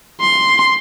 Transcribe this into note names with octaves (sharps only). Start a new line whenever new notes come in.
C6